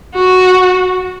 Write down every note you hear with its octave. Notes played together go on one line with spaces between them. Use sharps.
F#4